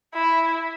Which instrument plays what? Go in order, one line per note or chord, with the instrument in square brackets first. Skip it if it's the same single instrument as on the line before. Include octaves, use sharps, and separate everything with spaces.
[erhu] E4